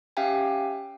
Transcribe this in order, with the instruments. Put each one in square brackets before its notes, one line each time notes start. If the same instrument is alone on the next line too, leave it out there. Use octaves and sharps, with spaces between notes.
[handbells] C#4 G4 E5 F5 G5 G#5